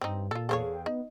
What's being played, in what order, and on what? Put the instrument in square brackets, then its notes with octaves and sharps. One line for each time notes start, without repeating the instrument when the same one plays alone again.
[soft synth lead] G2 [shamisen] C4 D#4
[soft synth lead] A#2 [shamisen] F4 A4
[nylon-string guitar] E2 G#4 F5 [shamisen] A4 C5 C#5
[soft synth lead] G5
[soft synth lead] B3 [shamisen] D#4